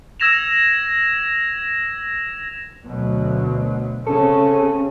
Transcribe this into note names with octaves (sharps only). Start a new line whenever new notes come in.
E6 G#6 A#6 E7 F7
D2 B2 F#3
C#3 C4 C#4 A4